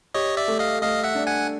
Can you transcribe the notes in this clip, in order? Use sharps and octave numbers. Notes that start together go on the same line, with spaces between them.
G4 C#5 D#5
D5 E5
A3
D#5 F5
A3 D#5 F5
E5 F#5
D4
F#5 G#5